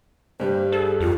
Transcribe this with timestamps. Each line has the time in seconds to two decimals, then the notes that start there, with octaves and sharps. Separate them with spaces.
0.40 G2 G3 C5
0.72 G#4 A4
1.00 F2 F4